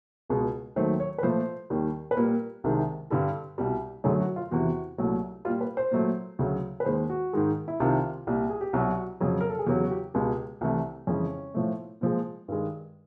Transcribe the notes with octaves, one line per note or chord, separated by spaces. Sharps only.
C#2 B2 G#3
D#2 D#3 F#3 A3 C5
C#5
B4
A#2 F3 A3 C5
D#2 D#3 G3
B4
A#2 G3 A#4
C2 C3 D#3 G#3
G2 D3 G3 A4
C2 B2 G3
F#2 D3 F#3 A3 G#4
F#4
F4
E2 C3 E3 F#4
C2 A#2 F#3 A3
A#2 G3 F4
B4
C5
A#2 F#3 A3
D2 C#3 F#3
B4
D#2 D#3 G#3 C5
F#4
G#2 D#3 G#3
E4
C2 C3 D#3 F4
C2 A#2 G3
G#4
G4
C2 B2 F#3 F#4
F2 C#3 F#3
A#4
A4
G#4
E2 C#3 F#3 G4
F#4
G4
C#2 B2 G#3 G4
C2 C3 E3 A3
F2 C#3 E3 G#3 C#4
A2 F3 A3
A#2 F3 G#3
G2 D#3 G#3